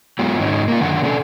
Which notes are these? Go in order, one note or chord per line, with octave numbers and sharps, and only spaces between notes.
F#3 G#3 B3 F4
G#2 D#3 C#4 D#4
A#3 F4
F#2 D3 D#3 F#5
B2 C#4 D4 A4